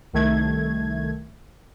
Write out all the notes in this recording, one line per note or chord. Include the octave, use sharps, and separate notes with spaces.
C2 D#3 A3 G#6